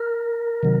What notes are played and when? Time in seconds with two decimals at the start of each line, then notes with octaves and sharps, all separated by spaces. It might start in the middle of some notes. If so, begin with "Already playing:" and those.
Already playing: A#4
0.63 C3 D#3 F#3